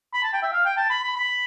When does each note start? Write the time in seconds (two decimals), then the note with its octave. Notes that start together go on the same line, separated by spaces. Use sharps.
0.13 B5
0.23 A5
0.33 G5
0.43 E5
0.53 F5
0.65 G5
0.77 A5
0.90 B5
1.04 B5
1.16 B5